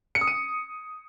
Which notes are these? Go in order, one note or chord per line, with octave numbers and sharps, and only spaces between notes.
C#7
D#6
D#7